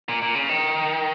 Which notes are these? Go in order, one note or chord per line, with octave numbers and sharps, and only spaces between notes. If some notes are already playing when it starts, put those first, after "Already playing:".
A#2
A#2
C#3
D#3